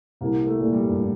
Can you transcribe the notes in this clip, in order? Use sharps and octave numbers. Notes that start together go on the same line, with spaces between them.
C2 A#3
A3
A#2
G3
G2
A2